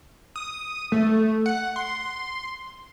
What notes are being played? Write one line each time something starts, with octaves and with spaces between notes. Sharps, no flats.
D#6
A3
F#5
C6